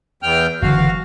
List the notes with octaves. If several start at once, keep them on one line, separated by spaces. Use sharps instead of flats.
E2 G5 F6
F#1 D3 E3 F#4 F5